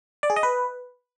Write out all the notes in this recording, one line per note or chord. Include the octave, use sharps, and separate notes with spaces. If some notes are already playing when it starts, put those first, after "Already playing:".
D5
G#4
D#5
B4